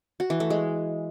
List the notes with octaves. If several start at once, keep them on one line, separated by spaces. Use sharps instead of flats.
F#4
E3
A3
G#3